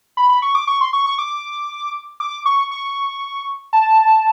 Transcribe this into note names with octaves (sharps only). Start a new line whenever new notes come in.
B5
B5
C#6
D6
C#6
C6
C#6
C#6
D6
D6
C#6
C#6
A5